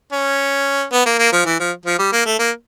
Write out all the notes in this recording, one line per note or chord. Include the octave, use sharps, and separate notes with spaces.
C#4
B3
A#3
A#3
F3
E3
F3
F3
G3
A#3
A3
A#3